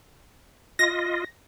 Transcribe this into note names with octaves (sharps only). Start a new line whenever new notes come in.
F4 D#5 A#6